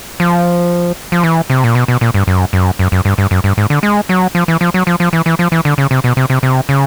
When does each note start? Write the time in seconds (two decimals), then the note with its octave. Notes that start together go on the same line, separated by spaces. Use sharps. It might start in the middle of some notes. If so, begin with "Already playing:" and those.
0.20 F3
1.12 F3
1.23 E3
1.50 C3
1.64 A#2
1.75 B2
1.88 B2
2.01 A#2
2.14 G2
2.27 F#2
2.53 F#2
2.79 F#2
2.92 F#2
3.05 G2
3.18 G2
3.31 F#2
3.44 G2
3.57 G#2
3.70 D3
3.83 G#3
4.09 F#3
4.35 F3
4.48 E3
4.61 F3
4.74 F#3
4.87 F3
5.00 F3
5.13 E3
5.26 E3
5.39 F3
5.52 E3
5.65 D3
5.78 C#3
5.91 C3
6.04 B2
6.17 C3
6.30 C3
6.43 C3
6.69 C#3